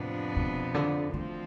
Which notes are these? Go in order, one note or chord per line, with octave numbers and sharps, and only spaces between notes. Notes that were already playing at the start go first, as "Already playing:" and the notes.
Already playing: F2 A2 C3 F3 B3 D4
B2
D3
D2 D3 E3 F3 C4